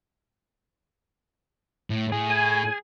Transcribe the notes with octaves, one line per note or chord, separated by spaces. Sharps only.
A2
A2 G#4
G#5